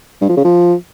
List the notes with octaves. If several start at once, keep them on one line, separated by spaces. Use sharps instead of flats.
G2
F3
C#3
F3